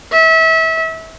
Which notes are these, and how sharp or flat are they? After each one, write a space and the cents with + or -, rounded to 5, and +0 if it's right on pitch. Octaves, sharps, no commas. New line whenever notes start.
E5 -30